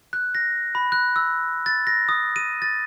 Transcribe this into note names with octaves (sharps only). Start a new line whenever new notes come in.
F#6
A#6
B5
F#6
E6
A6
A#6
D#6
D#7
A6